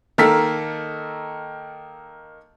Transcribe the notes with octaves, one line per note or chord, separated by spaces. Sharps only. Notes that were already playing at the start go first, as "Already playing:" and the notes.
D#3 A#3 A4 E6 B6